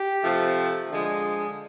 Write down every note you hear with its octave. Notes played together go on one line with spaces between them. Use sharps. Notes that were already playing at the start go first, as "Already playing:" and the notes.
Already playing: G4
C3 F3 A3
D3 F3 G#3